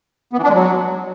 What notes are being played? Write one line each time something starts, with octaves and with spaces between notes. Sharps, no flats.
B3
E3
D4
G#3
F#3